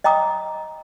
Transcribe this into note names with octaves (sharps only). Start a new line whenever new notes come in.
D#5 G5 A#5 D6 D#6